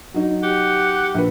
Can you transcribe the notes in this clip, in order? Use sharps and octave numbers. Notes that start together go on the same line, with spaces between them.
F#3 D#4
G4 F#5
A#1 B4